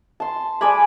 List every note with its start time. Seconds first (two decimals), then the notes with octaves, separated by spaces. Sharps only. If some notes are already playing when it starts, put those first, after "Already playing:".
0.20 A5 C6
0.61 G#3 D5 G#5 B5